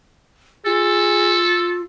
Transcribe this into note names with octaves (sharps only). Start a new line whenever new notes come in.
F4 G#4 A4